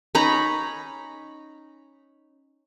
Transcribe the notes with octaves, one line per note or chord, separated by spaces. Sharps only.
C#4 D#4 A#5 B5